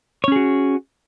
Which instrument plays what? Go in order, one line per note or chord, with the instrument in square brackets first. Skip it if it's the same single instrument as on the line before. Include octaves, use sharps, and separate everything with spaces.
[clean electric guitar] C#5
C#4
G#4
F#4